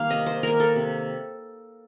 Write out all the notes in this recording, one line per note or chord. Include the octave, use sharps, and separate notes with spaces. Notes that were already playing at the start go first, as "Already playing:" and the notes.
Already playing: D#3 G3 A#3 F5
C3 D#5
C5
D#3 A#3 A#4
A4
C3